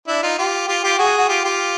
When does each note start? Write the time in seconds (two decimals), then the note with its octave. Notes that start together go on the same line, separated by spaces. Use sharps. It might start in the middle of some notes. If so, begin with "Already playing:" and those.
0.08 D4 E4
0.23 D#4 F4
0.38 F4 G4
0.68 F4 G4
0.83 F4 G4
0.98 F#4 G#4
1.18 F#4
1.28 F4 G4
1.44 F4 G4